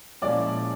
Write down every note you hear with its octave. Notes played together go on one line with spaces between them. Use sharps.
A#2 F3 G#3 C#4 E4 D5 D6